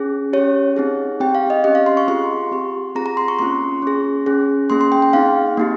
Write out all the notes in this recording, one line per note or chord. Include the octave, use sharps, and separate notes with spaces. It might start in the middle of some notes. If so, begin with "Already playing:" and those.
Already playing: C#4 G#4
C#4 G4 C#5
C4 D#4 G#4
C4 G4 G5
F5
D#5
C#4 G4 D#5
F5
C6
C#6
C4 F4 G#4 C6
C4 G4
C4 F4 G#4 A#5
A#5
C6
C#6
A#3 C#4 F4 C6
C#4 G#4
C#4 G#4
A#3 C#4 G#4 C6
C6
G5
G5
C4 D#4 G#4 F5
A#3 D#4 G4